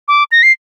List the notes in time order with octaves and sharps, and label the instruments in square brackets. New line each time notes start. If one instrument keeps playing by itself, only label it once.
[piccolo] D6
A#6
C7